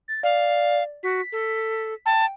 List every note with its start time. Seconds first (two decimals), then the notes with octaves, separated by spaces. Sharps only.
0.08 A6
0.23 D5 F5
1.03 F#4 B6
1.32 A4
2.06 G5 A5